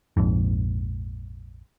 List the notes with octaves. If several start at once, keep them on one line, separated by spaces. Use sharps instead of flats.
A#1 F2 G#2